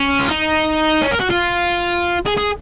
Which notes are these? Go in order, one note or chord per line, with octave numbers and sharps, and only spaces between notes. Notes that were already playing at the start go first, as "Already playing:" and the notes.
Already playing: C#4
F4
D#4
C#4
A#4
F#4
F4
G#4
G#4